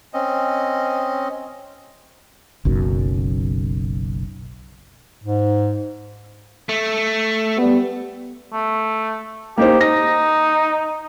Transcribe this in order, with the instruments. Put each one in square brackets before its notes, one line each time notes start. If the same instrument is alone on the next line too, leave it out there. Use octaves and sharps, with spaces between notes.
[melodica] C4 C#4 D#5
[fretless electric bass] F#1 B1 F#2
[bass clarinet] G#2
[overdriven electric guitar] A3
[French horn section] G3 B3
[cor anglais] A3
[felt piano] A#3 D#4 C5 [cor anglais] G4
[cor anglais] D#4 [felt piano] A#6